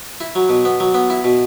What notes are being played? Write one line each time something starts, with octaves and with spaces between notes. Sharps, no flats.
E4
F#3
B2
B3
F#3
B3
E4
B2